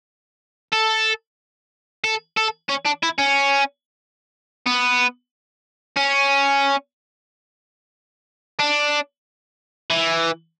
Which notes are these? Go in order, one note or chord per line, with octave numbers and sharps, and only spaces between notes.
A4
A4
A4
C#4
D4
E4
C#4
B3
C#4
D4
E3